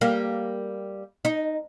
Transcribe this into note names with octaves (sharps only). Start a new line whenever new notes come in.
G3 A#3
D#4